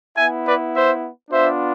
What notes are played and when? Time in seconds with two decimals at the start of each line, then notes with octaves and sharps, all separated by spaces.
0.17 B3 E4 E5 G#5
0.46 B4 D5
0.74 C5 E5
1.31 B3 D4 F4 C5 E5